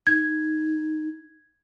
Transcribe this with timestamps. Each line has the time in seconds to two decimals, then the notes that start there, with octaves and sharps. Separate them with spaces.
0.07 D#4 G#6